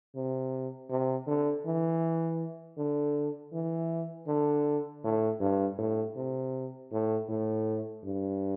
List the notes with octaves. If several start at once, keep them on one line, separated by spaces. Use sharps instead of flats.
C3
C3
D3
E3
D3
E3
D3
A2
G2
A2
C3
A2
A2
G2